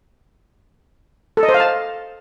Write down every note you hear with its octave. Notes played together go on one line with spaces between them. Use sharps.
A4
D#5
C5
F5
A5